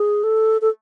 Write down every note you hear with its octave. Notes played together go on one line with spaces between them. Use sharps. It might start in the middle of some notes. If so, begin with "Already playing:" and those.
Already playing: G#4
A4
A4